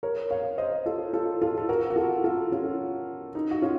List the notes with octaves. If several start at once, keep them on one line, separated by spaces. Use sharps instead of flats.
A#4 C#5
C#5 F5
C5 D#5
F4 A4
F4 A4
F4 A4
A4
F#4 A#4
F#4
F4 A4
F4 A4
C#4 F4
D#4
F#4
C#4 F4